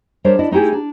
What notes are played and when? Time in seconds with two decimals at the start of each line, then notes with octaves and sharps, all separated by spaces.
0.24 G3 D4 A#4 C5 C#5 E5
0.39 D4 E4 D5 D#5
0.51 A3 D#4 E4 G4 G#4
0.72 D4